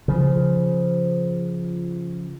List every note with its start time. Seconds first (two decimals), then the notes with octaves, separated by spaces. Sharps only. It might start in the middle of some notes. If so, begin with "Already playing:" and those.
0.08 C#3 F3